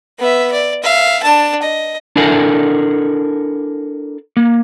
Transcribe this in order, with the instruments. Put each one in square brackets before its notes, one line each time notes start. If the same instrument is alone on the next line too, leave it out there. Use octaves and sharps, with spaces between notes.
[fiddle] B3 E5
D5
E5 F5
D4 A5
D#5
[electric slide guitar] D4 E4 A4 A#4 F#5 G#5
A#3